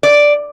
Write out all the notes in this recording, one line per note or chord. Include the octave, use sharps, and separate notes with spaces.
D5